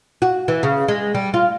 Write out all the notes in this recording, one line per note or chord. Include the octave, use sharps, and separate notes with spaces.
F#4
E3
C#3
G#3
G3
F4